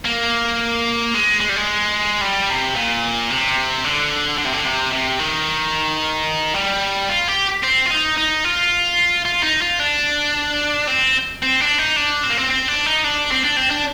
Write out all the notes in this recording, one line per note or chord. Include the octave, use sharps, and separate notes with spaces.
A#3
G#3
G#3
G3
G#3
G3
C3
A#2
C3
D3
D3
C3
D3
C3
C3
D#3
G3
F4
G4
C4
F4
D#4
D#4
F4
F4
D#4
F4
D4
C4
C4
D4
D#4
D4
C4
A#3
C4
C4
D4
D#4
D4
C4
D4
C4
D4